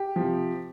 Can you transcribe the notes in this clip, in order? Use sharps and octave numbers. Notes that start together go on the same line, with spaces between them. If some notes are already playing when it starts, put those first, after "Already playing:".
Already playing: G4
C3 F3